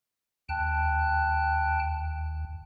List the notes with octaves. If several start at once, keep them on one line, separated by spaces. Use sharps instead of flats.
D#2 G5 A5 F#6